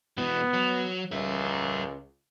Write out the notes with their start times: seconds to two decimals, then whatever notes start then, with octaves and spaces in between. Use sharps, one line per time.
0.18 B2 E3 B3
0.54 F#3
1.12 C#2 A#4 E5